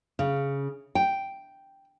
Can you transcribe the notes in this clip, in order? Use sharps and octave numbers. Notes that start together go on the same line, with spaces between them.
C#3
G5